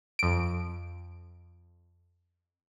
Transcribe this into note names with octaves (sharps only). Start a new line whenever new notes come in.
F2 D7